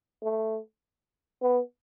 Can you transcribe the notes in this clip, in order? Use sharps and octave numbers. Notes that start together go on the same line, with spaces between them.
A3
B3